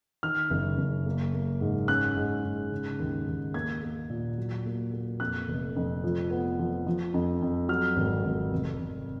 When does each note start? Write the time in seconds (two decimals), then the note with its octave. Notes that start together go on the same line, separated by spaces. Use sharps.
0.23 D#3 F6
0.50 F#1
0.78 F#1
1.06 A#3
1.34 A#3
1.61 G#2
1.88 C#4 F#6
2.16 G#2
2.45 G#2
2.71 C#3
3.00 D#2
3.27 D#2
3.54 A#3 G#6
3.82 A#3
4.10 A#2
4.38 F#3
4.66 A#3
4.93 A#3
5.20 F2 F#6
5.49 F1
5.76 F2
6.04 F3
6.30 B3
6.59 F3
6.87 F3
7.14 F2
7.42 F2
7.69 F#3 F6
7.96 G#1
8.25 G#1
8.52 F1
8.80 F1